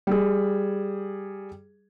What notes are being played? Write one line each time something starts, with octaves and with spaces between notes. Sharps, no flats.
G3 G#4